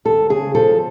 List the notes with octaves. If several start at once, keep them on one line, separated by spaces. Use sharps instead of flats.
D#2 A4
C#3 G#4
F3 A4